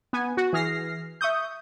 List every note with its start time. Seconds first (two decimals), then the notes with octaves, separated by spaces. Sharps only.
0.13 B3 G#5
0.37 F#4
0.53 E3 G#4 F6 A#6 C7
1.21 E5 C#6 D#6 G6